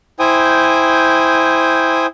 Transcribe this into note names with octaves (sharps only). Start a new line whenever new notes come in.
E4 C5 G5 G#5 D#6